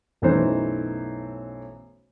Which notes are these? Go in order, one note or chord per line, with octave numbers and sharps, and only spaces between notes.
B1 F#2 E3 A3 D#4 C5